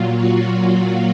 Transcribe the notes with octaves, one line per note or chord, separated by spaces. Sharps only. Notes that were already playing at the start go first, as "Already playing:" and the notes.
Already playing: A#2 F#3 F4
F#4